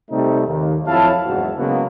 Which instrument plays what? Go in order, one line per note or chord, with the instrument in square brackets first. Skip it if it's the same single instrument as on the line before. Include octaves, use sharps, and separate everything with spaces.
[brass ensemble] C3 G3 A3 C4 D#4
D#2
F2 F#3 E4 C#5 F5 A5
F#1 E2 G#2 F#4
C#3 F#3 G#3 A#3 B3